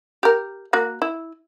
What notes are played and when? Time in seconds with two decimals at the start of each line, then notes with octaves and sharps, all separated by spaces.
0.23 G4 A#4
0.73 A#3 F#4
1.02 E4